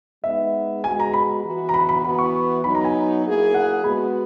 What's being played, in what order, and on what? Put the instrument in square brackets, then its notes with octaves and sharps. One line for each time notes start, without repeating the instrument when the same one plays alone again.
[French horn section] G#3 B3 D#4 [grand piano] E5
[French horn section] G#3 B3 F#4 [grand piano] G#5
[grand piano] A#5
B5
[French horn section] E3 B3 F#4
[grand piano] A#5
B5
B5
[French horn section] E3 B3 F#4 [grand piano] B5
[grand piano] C#6
[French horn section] F#3 B3 D#4 [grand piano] B5
[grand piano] A#5
G#5
[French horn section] F#3 A#3 E4 G#4
[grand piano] F#5
[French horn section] G#3 B3 F#4 [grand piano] B5